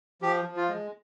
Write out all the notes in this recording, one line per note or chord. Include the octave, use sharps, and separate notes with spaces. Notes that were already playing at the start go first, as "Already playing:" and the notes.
F3 G4
F3
F4
G#3